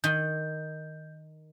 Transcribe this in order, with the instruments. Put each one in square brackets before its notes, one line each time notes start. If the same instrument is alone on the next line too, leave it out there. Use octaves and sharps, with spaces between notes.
[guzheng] D#3 [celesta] G6